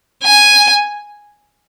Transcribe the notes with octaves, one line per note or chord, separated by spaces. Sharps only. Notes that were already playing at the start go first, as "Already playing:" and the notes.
G#5